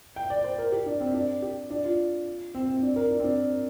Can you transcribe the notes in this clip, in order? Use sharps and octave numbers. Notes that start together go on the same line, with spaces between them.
G5
D5
C5
A#4
G4
D4
C4
D4
G4
D4
F4
C4
C4
D4
A#4
D4
C4
D4